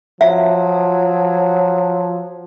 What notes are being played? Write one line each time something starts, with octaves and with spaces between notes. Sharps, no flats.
F3 F#3 E5